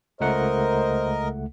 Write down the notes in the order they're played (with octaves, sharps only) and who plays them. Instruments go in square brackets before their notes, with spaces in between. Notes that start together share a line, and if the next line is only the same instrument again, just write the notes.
[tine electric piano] C#2 A3 F#5 [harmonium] A#4 D#5 [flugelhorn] C5